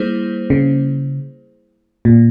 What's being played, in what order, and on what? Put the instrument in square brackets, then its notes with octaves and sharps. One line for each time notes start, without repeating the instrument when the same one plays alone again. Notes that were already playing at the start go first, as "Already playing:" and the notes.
Already playing: [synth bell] G3 A#3 E4 G#4 C5
[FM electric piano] C#3
A#2